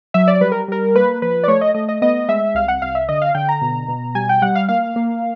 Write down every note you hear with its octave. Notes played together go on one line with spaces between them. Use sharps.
F#3 E5
D5
G3 B4
A#4
G3 A#4
A#3 B4
F3 B4
D5
A3 C#5
D#5
A3 D#5
D#5
B3 D#5
G#3 E5
C2 F5
F#5
C2 F5
E5
D3 D#5
F5
D3 G5
A#5
B2
B2
G3 G#5
G5
G3 F#5
F5
A#3 F5
A#3